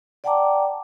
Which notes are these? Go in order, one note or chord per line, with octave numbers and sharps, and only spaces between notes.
D5 F#5 G5 A5 A#5 D6